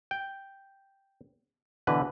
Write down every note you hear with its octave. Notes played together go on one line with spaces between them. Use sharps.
G5
B2 D3 E3 B4